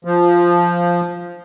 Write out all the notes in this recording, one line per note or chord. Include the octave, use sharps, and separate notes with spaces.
F3